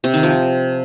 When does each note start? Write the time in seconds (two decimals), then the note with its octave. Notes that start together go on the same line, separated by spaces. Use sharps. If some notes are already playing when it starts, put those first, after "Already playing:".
0.04 C3
0.14 D#3
0.23 F3